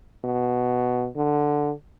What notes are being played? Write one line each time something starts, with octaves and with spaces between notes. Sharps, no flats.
B2
D3